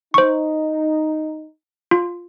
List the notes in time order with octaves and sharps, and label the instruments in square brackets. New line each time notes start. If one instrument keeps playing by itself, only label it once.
[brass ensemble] D#4 [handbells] C5 C#6
[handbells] F4